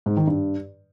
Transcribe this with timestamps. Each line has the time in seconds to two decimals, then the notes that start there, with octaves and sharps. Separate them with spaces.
0.06 G#2
0.17 D#3
0.27 G2